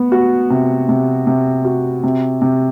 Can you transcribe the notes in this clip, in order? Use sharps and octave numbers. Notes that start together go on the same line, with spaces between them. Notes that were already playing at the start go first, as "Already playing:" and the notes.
Already playing: B3
F#4
C3
C3
C3
F#4
C3
C3